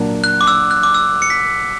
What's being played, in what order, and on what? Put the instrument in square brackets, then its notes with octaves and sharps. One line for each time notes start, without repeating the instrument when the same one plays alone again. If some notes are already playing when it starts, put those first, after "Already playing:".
Already playing: [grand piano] A#2 F#3 A#3 D4
[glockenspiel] F#6
D6
E6
F#6
D6
E6
C#7
B6